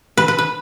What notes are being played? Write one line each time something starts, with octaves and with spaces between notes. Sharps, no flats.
B4
B4
B4